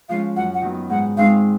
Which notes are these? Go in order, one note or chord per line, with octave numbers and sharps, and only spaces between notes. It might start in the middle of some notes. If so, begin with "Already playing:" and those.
F3 G#3 C#4 F5
F#2 F#5
F#5
D#3 F#3 B3
G#2 F#5
D#3 G#3 C4 D#4 F5